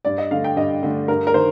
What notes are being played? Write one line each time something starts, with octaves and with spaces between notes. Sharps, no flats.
G2 D5
D#5
D3 A3 F5
G5
G2 D#5
D3 A3
G2 A#4
A#4
D#3 C5